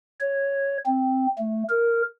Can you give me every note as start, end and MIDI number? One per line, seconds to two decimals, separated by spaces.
0.20 0.77 73
0.86 1.27 60
1.38 1.63 57
1.69 2.02 70